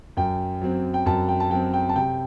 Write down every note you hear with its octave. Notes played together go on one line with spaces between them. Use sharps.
F#2 G5
F#3 C4
G5
F#2 A5
G5
A5
F#3 C4 G5
G5
A5
C3 G5